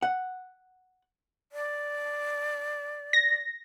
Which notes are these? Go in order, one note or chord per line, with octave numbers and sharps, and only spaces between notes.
F#5
D5
A#6